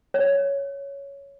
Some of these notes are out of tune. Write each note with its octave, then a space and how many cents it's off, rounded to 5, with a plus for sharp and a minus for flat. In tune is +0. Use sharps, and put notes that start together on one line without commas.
C#5 +5